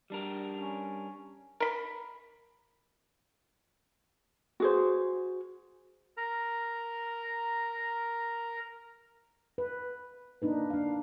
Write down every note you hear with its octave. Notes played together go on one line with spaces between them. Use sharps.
G3 D4 A#4
C#4
A#4 B5
F#4 G#4 C5
A#4 A#5
B4
A#3 D4 D#4 B4
D4 F5